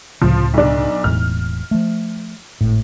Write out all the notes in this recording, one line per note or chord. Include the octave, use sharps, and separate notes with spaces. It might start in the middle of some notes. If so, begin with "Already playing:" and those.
C#2 A2 C3 F3
B1 D4
E1 E2 A2 F6
F3 A3
G#1 A2